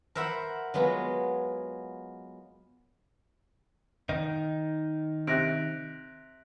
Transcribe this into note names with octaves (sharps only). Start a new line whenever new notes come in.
A#4 C5 E5 F#5 B5
F#3 G#3 B3 F4
D#3 D#4
C3 F#6 A#6 D7